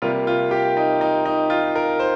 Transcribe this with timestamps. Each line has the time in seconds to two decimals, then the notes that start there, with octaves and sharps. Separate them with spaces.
0.02 C3 G3 A#3 F4
0.27 F4
0.51 G4
0.77 D#4
1.01 D#4
1.25 D#4
1.50 F4
1.75 A#4
1.99 C5